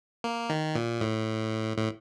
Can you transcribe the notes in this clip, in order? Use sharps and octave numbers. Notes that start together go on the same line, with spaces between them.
A#3
D#3
A#2
A2
A2